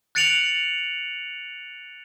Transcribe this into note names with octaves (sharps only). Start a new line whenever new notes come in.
F#6 A6 C#7 D7 F7 F#7